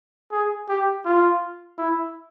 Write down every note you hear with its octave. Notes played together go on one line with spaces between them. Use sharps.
G#4
G4
F4
E4